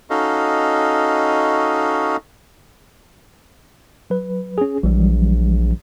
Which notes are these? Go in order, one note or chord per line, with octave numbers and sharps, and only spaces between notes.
C#4 D#4 F#4 A4 D#5 F5
F#3 B4
C#4 G#4
A#1 E3 F#3 G3